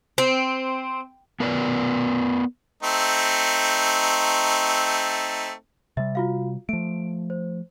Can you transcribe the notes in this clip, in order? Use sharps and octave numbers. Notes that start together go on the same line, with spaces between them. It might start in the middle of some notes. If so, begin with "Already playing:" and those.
C4
B3 A#4 B4 D5
A3 C4 D#4
C3 G3 E5
F4 F#4 F5
F3 A3 D7
C5